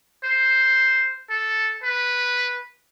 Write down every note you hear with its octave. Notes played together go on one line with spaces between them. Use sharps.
C5
A4
B4